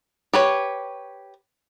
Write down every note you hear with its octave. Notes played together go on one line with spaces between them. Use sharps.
G4 B4 C#5